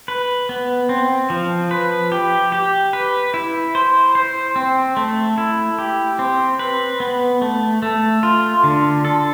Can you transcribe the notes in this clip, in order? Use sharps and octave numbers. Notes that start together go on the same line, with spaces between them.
B4
B3
C4
F3
B4
G4
G4
B4
E4
C5
C5
C4
A3
E4
G4
C4
B4
B3
A3
A3
F4
D3
A4